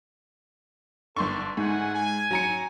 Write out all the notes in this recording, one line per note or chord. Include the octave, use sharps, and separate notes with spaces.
G1 D4 A4 C6 C#6
G#2 A3 F#5 G#5
G#5
F#3 A#5 C#7